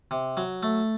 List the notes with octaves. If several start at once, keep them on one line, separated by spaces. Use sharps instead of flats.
C3
F#3
A3